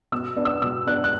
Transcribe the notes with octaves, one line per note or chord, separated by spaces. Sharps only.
B2 E6
B3 D4
E6
B2 E6
B3 D4 F#6
F#6